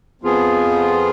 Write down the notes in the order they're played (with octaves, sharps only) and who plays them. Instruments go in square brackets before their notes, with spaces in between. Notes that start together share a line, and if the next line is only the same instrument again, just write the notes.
[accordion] F2 F3 B3 F4 G#4